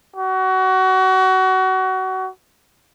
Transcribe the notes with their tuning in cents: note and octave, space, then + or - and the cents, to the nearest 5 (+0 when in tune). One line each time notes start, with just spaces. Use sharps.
F#4 +25